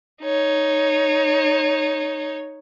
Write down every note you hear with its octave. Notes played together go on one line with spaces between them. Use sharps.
D#4 C#5